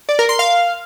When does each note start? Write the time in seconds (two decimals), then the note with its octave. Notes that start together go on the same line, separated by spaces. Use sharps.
0.09 D5
0.19 A#4
0.29 C6
0.39 F5